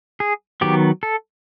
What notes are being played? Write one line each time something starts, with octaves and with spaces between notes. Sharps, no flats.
G#4
D#3 F#3 B3 G4
A4